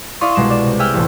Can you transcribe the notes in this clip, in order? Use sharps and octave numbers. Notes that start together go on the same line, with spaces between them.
E4 D5 F5 C6 C#6 D#6
C2 B2 G#3 C7 E7
D5 E7
C3
G#4 E5 G5 E6 F6
E1 A1